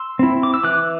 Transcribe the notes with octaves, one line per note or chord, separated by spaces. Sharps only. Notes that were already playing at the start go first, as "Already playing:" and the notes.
Already playing: C6 E6
C4 E4
D6
E6
E3 D6 F#6